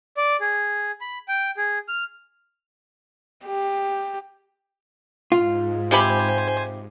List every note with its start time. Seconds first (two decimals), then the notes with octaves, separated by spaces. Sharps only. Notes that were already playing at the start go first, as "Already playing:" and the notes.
0.17 D5
0.40 G#4
1.01 B5
1.28 G5
1.57 G#4
1.88 F6
3.45 G4
5.32 G#2 F4
5.91 C3 G4 C5 G#5 B5